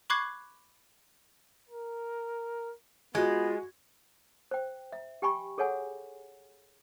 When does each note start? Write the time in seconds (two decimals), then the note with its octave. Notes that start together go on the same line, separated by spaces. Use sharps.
0.10 B5 C#6 D6 F#6 G#6 C7
1.70 A#4
3.15 G#3 B3 F4 F#4
4.51 C5 G5
4.92 E5
5.22 G4 G5 G#5 B5 C#6
5.58 G#4 A4 C#5 F#5 G#5